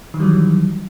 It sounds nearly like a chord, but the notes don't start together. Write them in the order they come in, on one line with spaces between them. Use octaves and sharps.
D#3 E3 G3 F#3